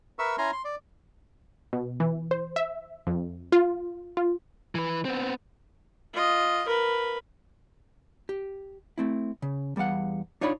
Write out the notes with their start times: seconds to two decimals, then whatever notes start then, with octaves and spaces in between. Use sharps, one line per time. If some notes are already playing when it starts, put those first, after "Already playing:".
0.19 A#4 B4 E5 C#6 E6
0.38 C#4 E4 G#5 A#5 C6
0.53 C6
0.65 D5
1.73 B2
2.00 E3
2.31 C5
2.56 E5
3.07 F2
3.52 F4
4.17 F4
4.75 E3 B4
5.05 B3 C4
6.13 F4 D#5
6.66 A#4 B4
8.29 G4
8.98 A3 C4 E4
9.42 C#3
9.76 E2 G3 B3 F5 F#5
10.41 D4 D#4 F4 C#5 D5 B5